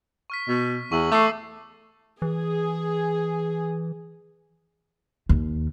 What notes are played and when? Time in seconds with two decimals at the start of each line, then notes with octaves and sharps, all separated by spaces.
0.30 C#6 F6 B6
0.48 B2
0.92 E2 C#6 E6 F#7
1.12 A3 D6 E6 C7
2.22 E3 G#4
5.29 D#2